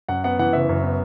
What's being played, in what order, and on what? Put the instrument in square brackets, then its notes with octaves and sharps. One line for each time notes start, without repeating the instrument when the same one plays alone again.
[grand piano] F#2 F#5
B3 F#5
E3 F#5
F#1 E5
F#2
B3